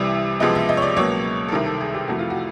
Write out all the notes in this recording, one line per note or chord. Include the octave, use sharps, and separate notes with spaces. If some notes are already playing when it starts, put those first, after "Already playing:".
Already playing: C2 C3 E3 G3
C#2 C3 F3 G#3 B3 D#5
E5
D#5
C#5
D5
C#2 B2 F#3 A#3 C#5
A4
C2 C3 D#3 A#4
A4
G#4
G4
F2 C3 E3 A3 F#4
F4
F#4